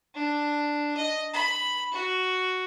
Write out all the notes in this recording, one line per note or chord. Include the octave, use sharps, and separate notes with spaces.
D4
D#5
B5
F#4